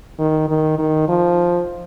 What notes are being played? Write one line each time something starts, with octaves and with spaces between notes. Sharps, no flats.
D#3
D#3
D#3
F3